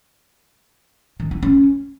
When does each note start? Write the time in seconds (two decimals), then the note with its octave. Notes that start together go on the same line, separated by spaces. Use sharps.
1.20 D#3
1.31 E4
1.43 C#4